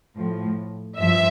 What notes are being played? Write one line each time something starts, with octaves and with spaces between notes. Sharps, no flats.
A2 F3
G2 F3 E5